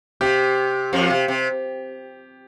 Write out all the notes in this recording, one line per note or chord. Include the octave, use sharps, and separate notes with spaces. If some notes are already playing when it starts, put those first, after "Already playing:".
C3 G4
F2 F3
C3
C3